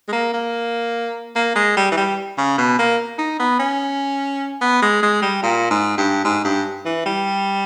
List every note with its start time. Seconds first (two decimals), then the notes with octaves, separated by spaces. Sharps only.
0.08 G#3
0.13 A#3
0.33 A#3
1.36 A#3
1.55 G#3
1.77 G3
1.92 E3
1.97 G3
2.38 C#3
2.58 B2
2.79 A#3
3.18 D#4
3.40 B3
3.59 C#4
4.61 B3
4.82 G#3
5.03 G#3
5.22 G3
5.43 A#2
5.71 G#2
5.98 G2
6.25 G#2
6.45 G2
6.86 E3
7.06 G3